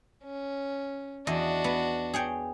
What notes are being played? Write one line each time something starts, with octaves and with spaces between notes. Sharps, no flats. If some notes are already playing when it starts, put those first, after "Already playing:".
C#4
E2 D4 F#4 D#5
B3
G#4 C#5 G5